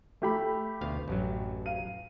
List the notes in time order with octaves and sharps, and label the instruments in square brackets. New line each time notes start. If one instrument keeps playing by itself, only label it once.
[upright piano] A3 G4 B5
[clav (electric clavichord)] D2 B2 F5
A1 F#2 F#3
[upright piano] F5 D#7